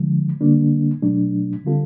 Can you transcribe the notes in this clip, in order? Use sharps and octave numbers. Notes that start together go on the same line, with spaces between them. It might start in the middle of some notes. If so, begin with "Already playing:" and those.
Already playing: D3 F3 G#3
D3 G3 A#3 D4
B2 F#3 A3 D4
D3 G3 C4 F4 A4